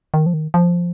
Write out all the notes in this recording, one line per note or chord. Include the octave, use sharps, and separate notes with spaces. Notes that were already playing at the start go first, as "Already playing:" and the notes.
D#3
F3
D#3
F3